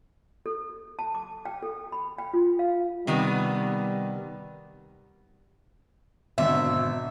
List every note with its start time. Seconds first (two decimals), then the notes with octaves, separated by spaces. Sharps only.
0.46 A4
0.99 A5
1.15 D6
1.45 G5
1.63 A4
1.92 B5
2.18 G5
2.34 F4
2.59 F5
3.07 C3 D#3 G3 B3
6.38 G#1 B2 D3 E5